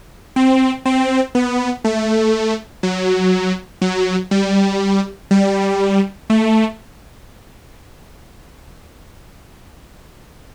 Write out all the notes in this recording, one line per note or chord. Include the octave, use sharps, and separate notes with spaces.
C4
C4
B3
A3
F#3
F#3
G3
G3
A3